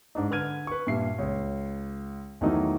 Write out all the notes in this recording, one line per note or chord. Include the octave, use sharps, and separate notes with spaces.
G#2 D4 D#4
D3 B4 F6 G#6 D#7
B4 C#6
G2 A#2 E5 C7
C#2 C#5
E2 D#3 E3 F#3 A3 D#4